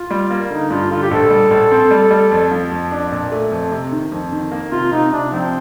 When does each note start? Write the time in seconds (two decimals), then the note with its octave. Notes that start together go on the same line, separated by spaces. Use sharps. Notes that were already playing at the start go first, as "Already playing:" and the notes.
Already playing: F4
0.11 G3
0.31 A#3
0.50 D3 D#4
0.70 G2 F4
0.91 D3 F4
1.02 G4
1.11 A#1 A4
1.31 G3
1.51 A#1
1.71 C4
1.91 G3
2.11 G3
2.31 F2
2.52 F3
2.72 F2
2.91 D4
3.12 A#2
3.32 A3
3.52 F2
3.72 C3
3.92 D#3
4.12 F2
4.32 D#3
4.52 A#3
4.71 C3 F4
4.92 C3 D#4
5.13 C3 D4
5.32 F3 C4